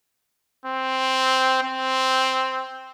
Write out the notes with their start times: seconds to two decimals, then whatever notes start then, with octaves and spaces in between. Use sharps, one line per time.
0.66 C4
1.63 C4